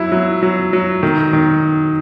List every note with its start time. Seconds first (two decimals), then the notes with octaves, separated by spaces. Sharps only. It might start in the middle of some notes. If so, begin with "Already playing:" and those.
Already playing: F#3 E4
0.12 F#3
0.43 F#3
0.73 F#3
1.03 D#3
1.33 D#3